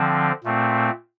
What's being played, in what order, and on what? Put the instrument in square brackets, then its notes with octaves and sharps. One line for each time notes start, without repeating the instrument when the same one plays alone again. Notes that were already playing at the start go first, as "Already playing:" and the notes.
Already playing: [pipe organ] D3 F3 C4
A#2 A3 C4